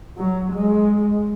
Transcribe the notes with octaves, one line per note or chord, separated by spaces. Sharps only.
F#3
G#3